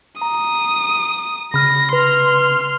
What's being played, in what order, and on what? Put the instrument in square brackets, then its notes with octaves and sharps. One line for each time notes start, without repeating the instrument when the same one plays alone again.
[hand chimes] A#5 [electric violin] D#6
[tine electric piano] C#3 [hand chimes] B5 F6 [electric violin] A#6
[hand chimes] B4 [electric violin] C6 F6